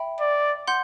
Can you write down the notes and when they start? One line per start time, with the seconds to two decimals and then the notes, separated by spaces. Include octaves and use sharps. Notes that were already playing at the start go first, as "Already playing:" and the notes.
Already playing: E5 G5 B5
0.20 D5
0.68 F#5 C6 G6